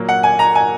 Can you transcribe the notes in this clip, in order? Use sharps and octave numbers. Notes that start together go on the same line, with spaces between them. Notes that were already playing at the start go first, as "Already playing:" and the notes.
Already playing: A#2 F#3 A#3
F#5
G#5
A#5
G#5